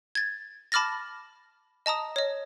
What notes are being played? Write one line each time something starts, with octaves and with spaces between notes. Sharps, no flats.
G#6 A6
A5 B5 D6 F6 A6 A#6
D#5 A5 A#5 D#6
C#5 D#5